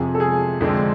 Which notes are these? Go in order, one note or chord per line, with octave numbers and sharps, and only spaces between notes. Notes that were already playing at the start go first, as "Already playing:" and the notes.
Already playing: F2 C3 F3 G#4
A4
G#4
F2 D3 G#3 C4